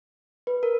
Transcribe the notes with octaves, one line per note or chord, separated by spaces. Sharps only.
B4
A#4